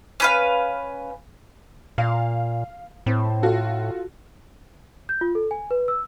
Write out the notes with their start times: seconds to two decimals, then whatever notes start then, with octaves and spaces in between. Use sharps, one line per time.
0.20 C#4 B4 F5
1.98 A#2 F5
3.06 A2 C4
3.43 F4 F#4 A4
5.09 G6
5.21 F4
5.35 A4
5.51 G#5
5.71 B4
5.88 E6